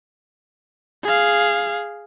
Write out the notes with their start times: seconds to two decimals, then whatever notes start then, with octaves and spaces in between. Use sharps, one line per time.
1.04 G#4 F5